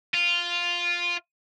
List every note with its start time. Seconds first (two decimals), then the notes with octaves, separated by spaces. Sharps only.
0.14 F4